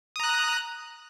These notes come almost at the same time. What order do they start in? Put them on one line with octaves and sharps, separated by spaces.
D#6 A#5 F#6